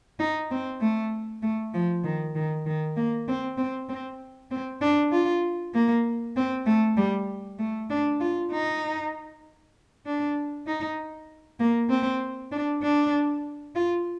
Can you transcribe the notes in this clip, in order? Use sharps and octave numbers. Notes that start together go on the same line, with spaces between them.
D#4
C4
A3
A3
F3
D#3
D#3
D#3
A#3
C4
C4
C4
C4
D4
F4
A#3
C4
A3
G3
A3
D4
F4
D#4
D4
D#4
A#3
C4
D4
D4
F4